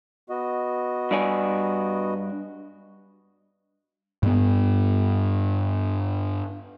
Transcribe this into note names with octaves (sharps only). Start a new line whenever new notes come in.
B3 F#4 D#5
G2 D5 G#5
G2 B3